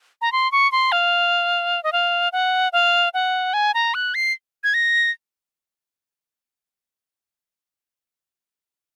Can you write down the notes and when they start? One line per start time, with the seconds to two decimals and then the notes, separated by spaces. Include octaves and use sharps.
0.22 A#5
0.32 C6
0.52 C#6
0.72 C6
0.92 F5
1.84 D#5
1.93 F5
2.32 F#5
2.73 F5
3.14 F#5
3.54 G#5
3.74 A#5
3.94 F#6
4.15 C7
4.64 G#6
4.74 A#6